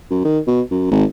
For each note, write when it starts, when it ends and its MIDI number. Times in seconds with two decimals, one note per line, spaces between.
0.11 0.24 42
0.25 0.39 51
0.47 0.62 47
0.71 0.88 42
0.91 1.05 32